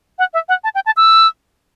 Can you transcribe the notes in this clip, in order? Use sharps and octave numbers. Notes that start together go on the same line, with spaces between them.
F#5
E5
F#5
A5
G5
A5
E6